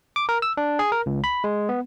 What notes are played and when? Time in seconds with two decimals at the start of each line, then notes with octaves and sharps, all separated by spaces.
0.16 D6
0.29 A#4
0.42 E6
0.57 D4
0.79 G#4
0.92 A#4
1.06 C#2
1.24 B5
1.44 G#3
1.69 B3